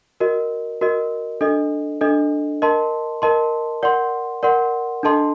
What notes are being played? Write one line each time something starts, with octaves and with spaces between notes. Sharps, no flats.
F#4 A#4 D#5
F#4 A#4 D#5
D4 A4 D#5
D4 A4 D#5
A#4 D#5 A5 C6
A#4 D#5 A5 C6
A#4 D5 F#5 C6
A#4 D5 F#5 C6
D4 A4 D#5 A5 C6